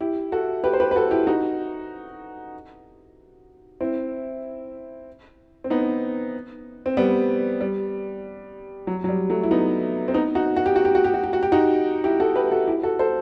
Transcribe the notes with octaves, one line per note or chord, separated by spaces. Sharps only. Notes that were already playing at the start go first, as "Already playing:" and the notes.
E4 G4
F#4 A4
G4 B4
C5
G4 B4
B4
F#4 A4
E4 G4
D#4 F#4
C4 E4
C4
B3 D#4
C4
G3 B3
G3
F#3
F#3
G3
F#3 A3
E4
B3 D#4
C4
B3 D#4
D#4 F#4
F#4
G4
F#4
G4
F#4
G4
F#4
G4
F#4
G4
D#4 F#4
E4 G4
F#4 A4
G4 B4
F#4 A4
E4 G4
F#4 A4
A4 C5